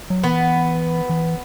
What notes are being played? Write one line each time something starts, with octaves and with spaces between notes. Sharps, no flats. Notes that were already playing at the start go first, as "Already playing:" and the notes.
F#3
E3 B3
E3